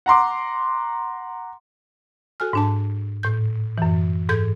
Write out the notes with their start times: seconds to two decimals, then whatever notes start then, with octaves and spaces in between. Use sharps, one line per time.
0.06 F#5 A#5 C6 D6
2.40 F#4 A4 G#5 F6
2.53 G#2 D4 A5
3.23 A2 G6
3.78 F#2 E3
4.29 G#2 G#4 A4 G6 G#6